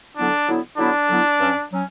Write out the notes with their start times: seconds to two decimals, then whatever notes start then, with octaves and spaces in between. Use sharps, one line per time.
0.16 D3 F#3 B3 D4 E4
0.47 D3 F#3 B3 E4
0.77 D3 F#3 B3 D4 E4
1.08 D3 F#3 B3 E4
1.38 G2 F#3 C#4
1.71 F#3 C#4